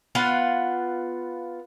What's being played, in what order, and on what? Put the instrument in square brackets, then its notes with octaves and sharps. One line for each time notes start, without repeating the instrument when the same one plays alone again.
[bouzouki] B3 F4 F5 F#5